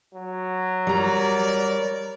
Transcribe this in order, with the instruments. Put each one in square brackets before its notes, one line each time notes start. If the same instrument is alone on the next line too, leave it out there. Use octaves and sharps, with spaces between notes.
[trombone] F#3
[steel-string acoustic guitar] G3 A#5 [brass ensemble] A#4 C#5 D5